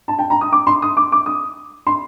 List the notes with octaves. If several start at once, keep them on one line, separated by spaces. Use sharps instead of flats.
A5
G5
A#5
D#6
D6
C6
D#6
D6
D6
D#6
C6